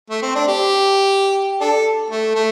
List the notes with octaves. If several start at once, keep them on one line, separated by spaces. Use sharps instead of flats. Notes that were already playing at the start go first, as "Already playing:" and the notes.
A3
C4
D4
G4
D4 A4
A3
A3